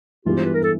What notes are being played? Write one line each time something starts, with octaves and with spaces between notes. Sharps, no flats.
G2 E3 G#3 B3 F4 G4
C5
B4
A#4
A4